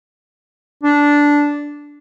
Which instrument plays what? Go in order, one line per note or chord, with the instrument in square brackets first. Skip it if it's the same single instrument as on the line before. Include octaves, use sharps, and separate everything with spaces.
[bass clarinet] D4